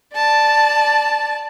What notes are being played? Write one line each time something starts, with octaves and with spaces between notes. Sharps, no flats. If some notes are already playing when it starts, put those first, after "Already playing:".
D5 A5